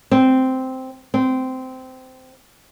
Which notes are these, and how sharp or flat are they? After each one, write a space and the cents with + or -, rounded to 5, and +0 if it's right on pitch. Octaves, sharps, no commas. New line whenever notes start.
C4 -5
C4 -15